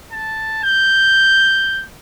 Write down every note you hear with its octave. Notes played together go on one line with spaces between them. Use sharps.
A5
G6